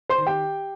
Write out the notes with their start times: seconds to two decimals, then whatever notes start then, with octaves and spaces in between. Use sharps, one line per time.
0.09 C5 C6
0.18 D#3
0.27 G4 G5